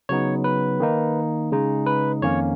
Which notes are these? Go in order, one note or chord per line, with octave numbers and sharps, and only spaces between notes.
C#3 F#3 B3 D#4 C#5
B4
D#3 A#3 D#4
C#3 G#3 D#4
B4
F2 D#3 A#3 C#4 C#5